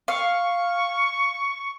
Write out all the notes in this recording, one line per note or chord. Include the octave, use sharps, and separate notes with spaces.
F5 C#6